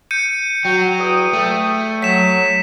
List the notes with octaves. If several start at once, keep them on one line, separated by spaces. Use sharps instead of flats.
G6 C#7 D#7
F#3 F#4 G5
E2 G5 D#6
A3
F#3 B6 E7